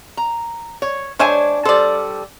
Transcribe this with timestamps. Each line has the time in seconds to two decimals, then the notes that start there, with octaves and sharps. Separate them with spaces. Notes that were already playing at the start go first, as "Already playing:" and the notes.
0.17 A#5
0.82 C#5
1.19 G#3 D4 C5 C#5 E5 G#5
1.65 G3 A4 C5 D5